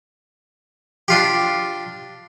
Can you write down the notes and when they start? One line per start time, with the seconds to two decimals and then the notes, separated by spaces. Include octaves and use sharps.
1.08 D4 F4 G4